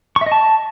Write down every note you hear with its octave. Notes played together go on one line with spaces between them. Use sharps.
C#6
E5
D#5
A5